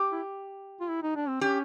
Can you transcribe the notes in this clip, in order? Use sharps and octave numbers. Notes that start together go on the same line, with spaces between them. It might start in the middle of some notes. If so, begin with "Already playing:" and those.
Already playing: G4
E4
F4
E4
D#4
D4
C4
C#4 G4